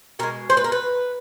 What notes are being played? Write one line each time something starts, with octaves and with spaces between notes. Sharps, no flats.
B2 G#3 A#4
C5
B4
A#4
B4